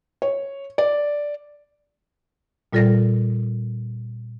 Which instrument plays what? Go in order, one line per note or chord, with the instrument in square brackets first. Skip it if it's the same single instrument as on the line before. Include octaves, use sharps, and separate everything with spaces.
[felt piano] C#5
D5
[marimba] A#2 G3 F4 A4 D5 A#6